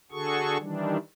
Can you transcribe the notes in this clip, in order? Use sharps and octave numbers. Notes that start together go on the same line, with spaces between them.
D3 F#4 G#4 A4 C#6
D#3 E3 G3 D4